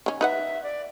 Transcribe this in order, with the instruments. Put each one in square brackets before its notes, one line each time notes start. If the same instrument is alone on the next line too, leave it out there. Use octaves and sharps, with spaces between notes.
[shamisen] D#3 C#4
[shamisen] D#4 B4 F#5 [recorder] E5
[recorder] D5